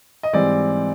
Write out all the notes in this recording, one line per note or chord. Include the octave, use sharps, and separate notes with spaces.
D#5
G#2 E3 G3 C4 D5